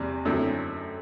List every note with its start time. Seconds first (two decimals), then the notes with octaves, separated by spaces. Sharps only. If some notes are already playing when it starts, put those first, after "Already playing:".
Already playing: E2 C3 G3
0.25 F#2 D3 A3 C4 E4